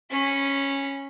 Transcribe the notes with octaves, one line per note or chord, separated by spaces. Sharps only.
C#4 B5